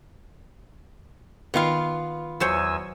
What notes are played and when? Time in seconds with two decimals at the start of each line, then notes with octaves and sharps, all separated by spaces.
1.54 D#3 B3 F4 F5
2.40 E2 F#3 C5 C#5 G#5 E6